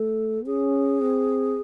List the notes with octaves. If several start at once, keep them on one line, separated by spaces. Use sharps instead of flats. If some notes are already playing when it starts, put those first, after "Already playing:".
Already playing: A3 A4
C#4 G#4
C4